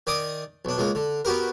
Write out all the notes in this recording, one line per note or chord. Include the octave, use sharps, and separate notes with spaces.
D#3 D5 D#5 G#5 D6 D#6
B1 D4
C#2 G#3 A#3
D3
B3 F#4 G4 A#4